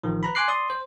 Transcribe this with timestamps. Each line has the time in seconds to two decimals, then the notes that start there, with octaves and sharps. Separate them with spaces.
0.03 A1 D#3 F3
0.23 B4 A#5 B5
0.35 G#5 C6 D6 F#6 C7
0.48 D5 C6 D#6
0.70 C5